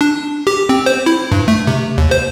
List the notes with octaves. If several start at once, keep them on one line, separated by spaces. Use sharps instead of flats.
D4
G4
C4
C5
E4
G2
A3
C3
D#2
C5